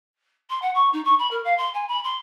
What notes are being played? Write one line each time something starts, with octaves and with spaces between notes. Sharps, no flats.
C6
F#5
C#6
D#4
C#6
B5
A#4
F5
C6
G#5
B5
C6